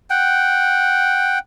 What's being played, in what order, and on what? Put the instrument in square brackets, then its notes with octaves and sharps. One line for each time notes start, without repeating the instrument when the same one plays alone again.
[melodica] F#5 G5